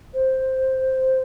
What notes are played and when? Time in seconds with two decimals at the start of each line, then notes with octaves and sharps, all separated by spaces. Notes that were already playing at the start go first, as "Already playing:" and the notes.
0.14 C5